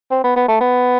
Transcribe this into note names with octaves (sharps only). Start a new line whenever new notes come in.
C4
B3
B3
A3
B3